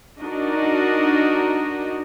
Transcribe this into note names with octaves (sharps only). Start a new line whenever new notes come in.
D4 D#4 F#4 A#4 D#5